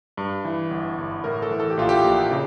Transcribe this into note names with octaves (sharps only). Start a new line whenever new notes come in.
G2
E3
G1
G1
A2 A#4
A4
E3
A4
G4
A#1 F4
G4
A#1
C#3